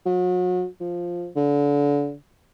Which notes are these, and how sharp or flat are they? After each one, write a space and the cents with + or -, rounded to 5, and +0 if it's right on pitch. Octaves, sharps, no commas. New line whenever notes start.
F#3 -35
F3 +0
D3 -30